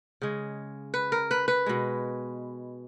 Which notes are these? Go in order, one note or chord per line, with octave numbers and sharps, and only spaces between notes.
C#3 G#3
B4
A#4
B4
B4
B2 G#3